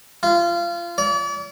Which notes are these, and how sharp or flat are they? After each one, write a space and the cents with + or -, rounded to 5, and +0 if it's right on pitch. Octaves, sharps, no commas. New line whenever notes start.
F4 -25
D5 -40